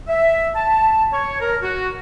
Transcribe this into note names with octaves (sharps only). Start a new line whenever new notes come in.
E5
A5
C#5
A#4
F#4